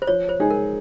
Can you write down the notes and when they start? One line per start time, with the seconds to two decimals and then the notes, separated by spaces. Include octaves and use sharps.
0.02 C5
0.07 F3 C#5
0.29 C5
0.39 G#3 D#4 G#4
0.50 A#4